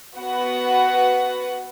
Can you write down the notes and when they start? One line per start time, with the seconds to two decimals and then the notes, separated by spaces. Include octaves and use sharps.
0.18 B3 F#4 B4 F#5